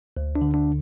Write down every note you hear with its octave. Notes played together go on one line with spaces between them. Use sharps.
D2
D4
D3
D4